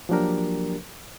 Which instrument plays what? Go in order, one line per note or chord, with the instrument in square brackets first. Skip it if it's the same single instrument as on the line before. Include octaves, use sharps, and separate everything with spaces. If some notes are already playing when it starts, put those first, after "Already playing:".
[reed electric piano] F3 F#3 A#3 D4 G4 A#4